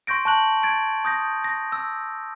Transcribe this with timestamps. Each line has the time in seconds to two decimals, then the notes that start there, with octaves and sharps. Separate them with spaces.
0.07 C6 C#6 G6 A#6 D7
0.25 A5 C#6 F#6 F#7
0.63 G#6 A6 D7
1.05 D#6 G6 A#6
1.44 A#6
1.72 E6